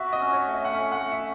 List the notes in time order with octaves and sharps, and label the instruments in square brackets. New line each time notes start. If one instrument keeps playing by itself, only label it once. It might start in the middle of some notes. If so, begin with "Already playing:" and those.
Already playing: [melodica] F#4 [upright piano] E5
[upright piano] D#5
[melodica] C#4
[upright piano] C#5
[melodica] A3
[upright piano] D#5
F#5
[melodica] C#4 [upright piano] E5
[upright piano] F#5
[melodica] A3
[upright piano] E5